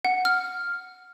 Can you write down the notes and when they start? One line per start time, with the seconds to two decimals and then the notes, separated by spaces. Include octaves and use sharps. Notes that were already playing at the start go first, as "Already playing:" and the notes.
0.05 F#5
0.25 F6